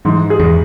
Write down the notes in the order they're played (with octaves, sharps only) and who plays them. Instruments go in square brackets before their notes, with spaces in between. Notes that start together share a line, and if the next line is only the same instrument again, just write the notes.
[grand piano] G#2 [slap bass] E3
[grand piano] G#4
[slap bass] E2